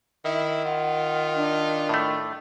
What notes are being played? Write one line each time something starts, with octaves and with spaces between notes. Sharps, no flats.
D#3 E4 E5
F4 F#5
D4
A2 A3